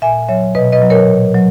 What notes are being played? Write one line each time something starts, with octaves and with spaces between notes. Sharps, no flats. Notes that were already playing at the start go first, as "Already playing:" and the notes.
A#2 E5 G#5
F#3 C#5 E5
B2 B4 D#5
B4 D#5
F#3
A#4 C#5
A#2
F#3